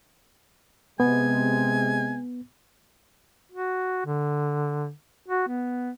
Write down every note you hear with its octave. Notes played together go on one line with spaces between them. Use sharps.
C3 G#3 B3 G#5
F#4
D3
F#4
B3